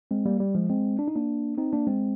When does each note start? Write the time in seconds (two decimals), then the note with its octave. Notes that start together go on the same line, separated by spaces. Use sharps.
0.11 G#3 C4
0.26 G3 A#3
0.40 G3
0.55 F3 G#3
0.70 G#3 C4
0.99 D4
1.08 D#4
1.16 A#3 D4
1.58 C4 D#4
1.73 A#3 D4
1.87 G#3 C4